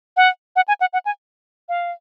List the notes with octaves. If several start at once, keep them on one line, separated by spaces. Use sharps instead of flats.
F#5
F#5
G#5
F#5
F#5
G#5
F5